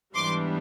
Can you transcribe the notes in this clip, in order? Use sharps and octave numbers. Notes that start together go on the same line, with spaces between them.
G#2 E3 G3 B3 D4 C6 D6